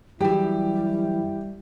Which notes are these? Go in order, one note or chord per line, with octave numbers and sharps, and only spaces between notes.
F#2 E3 G3 E4 G4